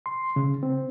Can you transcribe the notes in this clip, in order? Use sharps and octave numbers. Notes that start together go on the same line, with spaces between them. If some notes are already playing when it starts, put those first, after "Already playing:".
C6
C#3
C4